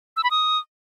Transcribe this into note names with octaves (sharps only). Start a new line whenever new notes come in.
E6
B5
D#6